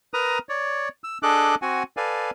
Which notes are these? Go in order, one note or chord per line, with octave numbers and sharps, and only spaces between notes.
A#4 B4 A#5 D#6
C#5 D5
E6
D4 G#4 A4 D#5 D6 F#6
C4 F#4 F#5 G#5
A4 B4 D5 F5 G#5